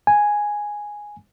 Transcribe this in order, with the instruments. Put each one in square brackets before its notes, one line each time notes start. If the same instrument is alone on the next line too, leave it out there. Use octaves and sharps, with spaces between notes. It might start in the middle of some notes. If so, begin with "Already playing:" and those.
[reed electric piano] G#5